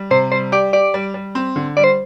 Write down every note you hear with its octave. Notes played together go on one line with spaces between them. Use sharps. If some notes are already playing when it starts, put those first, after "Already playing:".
Already playing: G3
C3 C5
G3 C5
G4 D5
G4 D5
G3
G3
C4
D3
G3 D5
C5